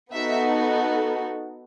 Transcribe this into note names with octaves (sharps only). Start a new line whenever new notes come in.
B3 D#4 F#4 A4 E5